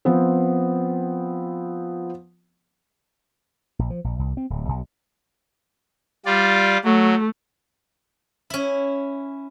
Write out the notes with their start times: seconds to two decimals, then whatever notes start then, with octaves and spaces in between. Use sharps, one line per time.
0.05 F3 B3 C4
3.79 A#1
3.90 F3
4.04 A#1
4.19 C2
4.37 C4
4.50 D1
4.68 B1
6.26 G3 F4 D5
6.84 F#3 A3
8.50 C#4 E4